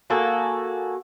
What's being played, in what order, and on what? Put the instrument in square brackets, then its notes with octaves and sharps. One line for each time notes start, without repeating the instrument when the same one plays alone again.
[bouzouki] A#3 F#4 G#4 A4